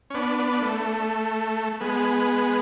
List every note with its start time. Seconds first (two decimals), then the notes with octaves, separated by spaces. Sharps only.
0.10 C#4
0.14 B3 D4
0.39 B3 D4
0.62 A3
1.80 G#3 B3